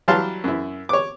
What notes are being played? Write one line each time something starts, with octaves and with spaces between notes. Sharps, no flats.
E3 F#3 G3 F5 A5 C6
F#2 E4
C#5 D6